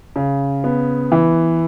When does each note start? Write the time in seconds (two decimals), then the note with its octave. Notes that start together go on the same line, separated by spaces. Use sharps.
0.16 C#3
0.64 B3
1.12 E3